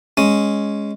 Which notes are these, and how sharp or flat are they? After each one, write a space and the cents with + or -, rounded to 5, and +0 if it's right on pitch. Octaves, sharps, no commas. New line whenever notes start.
G#3 +0 C#4 +0